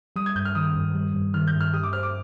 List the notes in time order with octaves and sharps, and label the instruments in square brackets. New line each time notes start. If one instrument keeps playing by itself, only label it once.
[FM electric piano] G3 [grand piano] D#6
[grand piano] G#6
[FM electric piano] G2 [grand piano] G6
[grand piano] F6
[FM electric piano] D#3 [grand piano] D#6
[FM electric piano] G2
G3
G2
[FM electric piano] D#3 [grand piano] F6
[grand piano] G6
[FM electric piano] G2
[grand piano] F6
[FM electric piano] G4 [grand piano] D#6
[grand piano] D6
[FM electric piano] C5 [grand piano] F6
[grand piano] D6